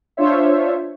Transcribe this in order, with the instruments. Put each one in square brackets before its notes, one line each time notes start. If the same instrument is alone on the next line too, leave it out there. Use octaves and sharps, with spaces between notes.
[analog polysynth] D4 F4 C5 C#5 E5